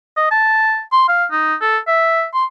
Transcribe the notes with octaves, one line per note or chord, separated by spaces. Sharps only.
D#5
A5
C6
F5
D#4
A4
E5
C6